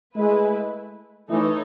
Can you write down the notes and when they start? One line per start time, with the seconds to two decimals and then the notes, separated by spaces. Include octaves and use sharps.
0.16 G#3 A3 E4 B4
1.30 E3 A3 D#4 A4 C#5